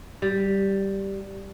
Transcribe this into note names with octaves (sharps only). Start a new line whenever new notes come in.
G3